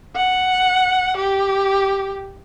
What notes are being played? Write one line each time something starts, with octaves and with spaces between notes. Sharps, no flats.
F#5
G4